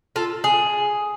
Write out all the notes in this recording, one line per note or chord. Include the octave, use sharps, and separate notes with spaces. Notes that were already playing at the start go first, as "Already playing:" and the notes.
F4 A4
G#4